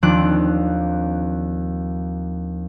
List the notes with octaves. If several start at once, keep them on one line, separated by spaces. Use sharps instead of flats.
D#2 F3 C4 D4 D6 F#6